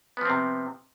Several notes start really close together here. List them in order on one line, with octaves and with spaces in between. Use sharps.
B3 F3 C4 C3